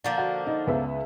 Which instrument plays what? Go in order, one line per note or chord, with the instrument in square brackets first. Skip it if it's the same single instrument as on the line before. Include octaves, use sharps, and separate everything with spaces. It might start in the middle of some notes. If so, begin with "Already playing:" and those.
[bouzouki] D3 F3 A#3
[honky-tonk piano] F#4
D#4
C#2 B3 E5